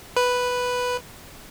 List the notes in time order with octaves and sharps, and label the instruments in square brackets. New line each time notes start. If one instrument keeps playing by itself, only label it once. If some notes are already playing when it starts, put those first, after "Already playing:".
[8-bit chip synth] B4